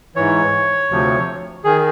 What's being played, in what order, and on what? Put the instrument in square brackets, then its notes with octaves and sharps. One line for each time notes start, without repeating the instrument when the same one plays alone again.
[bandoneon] G#2 E3 C#5
D2 C3 F3
D#3 G#4